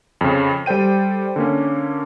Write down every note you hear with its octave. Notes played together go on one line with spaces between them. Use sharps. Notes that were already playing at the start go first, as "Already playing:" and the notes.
F2 C#3
G3 A4 C5 G5 D#7
D3 A#3 C#4